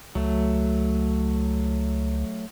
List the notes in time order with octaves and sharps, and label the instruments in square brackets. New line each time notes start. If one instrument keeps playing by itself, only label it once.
[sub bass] C#2 [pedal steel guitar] F#3 A3